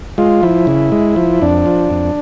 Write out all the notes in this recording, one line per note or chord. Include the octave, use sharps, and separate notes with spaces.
G#3 F4
F3 E4
C#3
G#3
F3
F2 D4
F3
F2